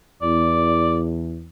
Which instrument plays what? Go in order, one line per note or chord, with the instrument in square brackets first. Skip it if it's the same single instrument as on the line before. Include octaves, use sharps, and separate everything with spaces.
[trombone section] E2 [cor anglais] D5